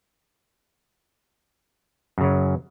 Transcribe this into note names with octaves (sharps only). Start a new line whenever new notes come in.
F#2 C#3 F#3